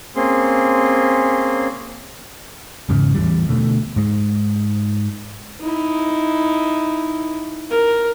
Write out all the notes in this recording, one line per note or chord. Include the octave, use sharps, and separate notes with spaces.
A#3 C4 C#4 G#4 C6
E2 G#2 C#3
A1 E2 E3 G3
D2 B2 A3
G#2 G#3
D#4 E4
A#4